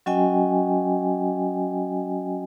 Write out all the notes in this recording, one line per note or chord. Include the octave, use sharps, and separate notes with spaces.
F#3 C#4 F#4 D#5 G5 G#5